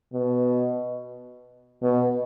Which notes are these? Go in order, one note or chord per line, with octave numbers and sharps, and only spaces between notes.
B2
B2